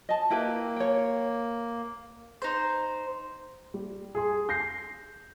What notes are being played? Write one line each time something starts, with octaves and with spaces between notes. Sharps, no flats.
D#5 A5
A#3 E4 G4 B4
C#5 G5
D#4 C5
G3
G#4 C6
G6 A#6 C7